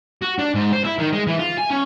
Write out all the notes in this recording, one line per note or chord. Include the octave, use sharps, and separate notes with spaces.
F#4
D4
G#2
C5
E4
D#3
G#3
E3
F4
G#5
C#4